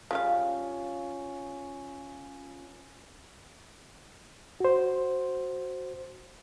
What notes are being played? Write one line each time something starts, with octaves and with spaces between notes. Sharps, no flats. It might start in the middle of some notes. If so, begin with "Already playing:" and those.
C#3 G3 C#4 F4 F5
F#4 C5